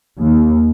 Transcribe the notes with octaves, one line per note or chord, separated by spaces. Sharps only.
D#2